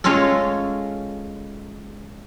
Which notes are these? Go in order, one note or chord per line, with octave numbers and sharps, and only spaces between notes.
G#3 C#4 F4 A4